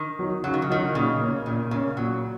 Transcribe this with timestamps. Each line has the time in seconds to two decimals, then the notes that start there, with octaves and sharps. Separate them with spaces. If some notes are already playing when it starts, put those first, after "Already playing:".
Already playing: D#3
0.19 F#3 D#4
0.44 C#3 F#3
0.54 D#3
0.62 C#3
0.69 D#3 F#3 D#4
0.95 A#2 C#3
1.21 A#3 C#4
1.46 A#2 D#3
1.71 C#3 A#3 C#4
1.97 A#2 F#3